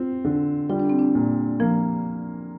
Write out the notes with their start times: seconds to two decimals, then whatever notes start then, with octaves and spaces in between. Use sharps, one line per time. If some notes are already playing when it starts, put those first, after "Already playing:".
Already playing: C4 F4
0.25 D3
0.69 G3 F4
0.80 D4
0.90 C4
0.99 D4
1.15 A#2
1.60 F3 A#3